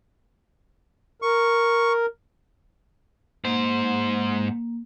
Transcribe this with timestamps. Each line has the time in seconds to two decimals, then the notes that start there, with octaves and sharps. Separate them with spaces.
1.22 A#4 C#6
3.44 G#2 A#3 C5